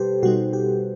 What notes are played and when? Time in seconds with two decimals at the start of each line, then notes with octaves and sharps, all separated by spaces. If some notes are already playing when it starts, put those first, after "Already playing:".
Already playing: B2 G3 G4 A4 B4 C5
0.23 B2 G3 D#4 F#4
0.53 G4